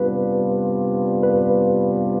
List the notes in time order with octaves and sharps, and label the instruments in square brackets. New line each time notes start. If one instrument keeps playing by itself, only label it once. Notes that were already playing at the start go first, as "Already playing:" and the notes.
Already playing: [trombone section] C3 G3 B3 D4 F4 [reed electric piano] B4
[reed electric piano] B4